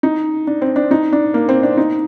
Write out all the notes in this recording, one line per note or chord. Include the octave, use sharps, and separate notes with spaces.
D#4
D4
C4
D4
D#4
D4
A#3
C4
D4
D#4